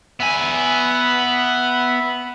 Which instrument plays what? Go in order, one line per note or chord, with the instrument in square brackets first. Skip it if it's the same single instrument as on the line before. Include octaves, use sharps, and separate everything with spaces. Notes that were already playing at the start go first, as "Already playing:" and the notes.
[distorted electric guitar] B3 G#5 [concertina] E5 B5